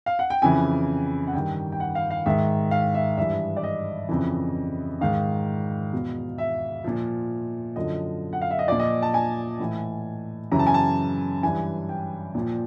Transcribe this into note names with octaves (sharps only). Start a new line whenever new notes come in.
F5
F#5
G5
F2 C#3 E3 G#5
F#5
G2 D#3 G5
G5
F#5
F5
F5
G#2 D#3 E5
F5
E5
G2 E3 E5
D5
D#5
F2 C#3 E3
G#2 D#3 F5
E2 B2
E5
A#2 F3
F#2 D3 F3 D#5
F#5
F5
E5
D#5
A#2 F3 D5
D#5
A5
G#5
A2 E3
F#2 C#3 E3 A#5
A5
G#5
A5
G2 E3 G#5
G5
A#2 F3